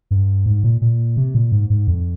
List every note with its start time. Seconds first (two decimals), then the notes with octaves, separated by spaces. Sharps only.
0.11 G2
0.46 G#2
0.64 A#2
0.81 A#2
1.17 C3
1.35 A#2
1.52 G#2
1.70 G#2
1.88 F2